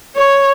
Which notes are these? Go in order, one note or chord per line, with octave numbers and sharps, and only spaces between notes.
C#5